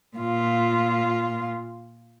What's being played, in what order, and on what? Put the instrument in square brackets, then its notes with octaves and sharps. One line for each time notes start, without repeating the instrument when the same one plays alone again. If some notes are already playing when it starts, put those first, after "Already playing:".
[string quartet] A#2 F4